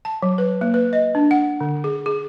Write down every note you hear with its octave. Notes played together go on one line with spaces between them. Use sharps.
A5
F#3
B4
A#3
B4
D#5
D4
F#5
D3
G#4
G#4